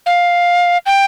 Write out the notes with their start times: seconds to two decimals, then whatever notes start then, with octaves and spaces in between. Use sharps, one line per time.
0.06 F5
0.86 G5